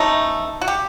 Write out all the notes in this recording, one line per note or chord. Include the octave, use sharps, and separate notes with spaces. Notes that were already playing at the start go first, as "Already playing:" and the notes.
Already playing: C3 E3 A3 C#4 D#4
F#4
G4